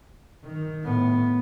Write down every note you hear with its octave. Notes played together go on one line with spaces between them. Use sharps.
D#3
A2 B3